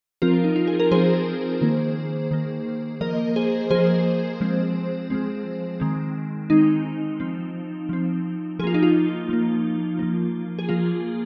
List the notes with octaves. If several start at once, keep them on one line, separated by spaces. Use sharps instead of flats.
F3 C4 F4 A#4
D#4
F4
G#4
A#4
F3 C4 G#4 C5
D#3 A#3
D#3 A#3
F3 A#3 A#4 D#5
G#4 C5
F3 A#3 G#4 C5
F3 G#3 C4
F3 G#3 C4
D#3 G#3 C4
D#3 G#3 C4 D#4
F3 C4
F3 C4
F3 A#3 F4 G#4
D#4
F4
F3 A#3
F3 A#3
G#4
F3 A#3 F4